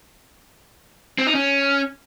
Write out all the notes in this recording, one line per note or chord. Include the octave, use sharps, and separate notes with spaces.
C4
D#4
C#4